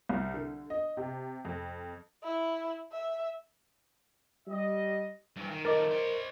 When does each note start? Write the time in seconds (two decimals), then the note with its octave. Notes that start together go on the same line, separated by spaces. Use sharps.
0.09 C2
0.34 D3
0.70 D#5
0.97 C3
1.45 F2
2.23 E4
2.92 E5
4.47 G3 D#5
5.36 G2 E3
5.50 D#3
5.65 D#3 F3 A3 A#4 D#5 D6 A6
5.91 C5 D5